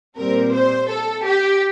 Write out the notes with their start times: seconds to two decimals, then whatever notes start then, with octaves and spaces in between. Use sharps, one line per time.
0.17 A#2 G3 C4 A#4
0.53 C5
0.89 A4
1.26 G4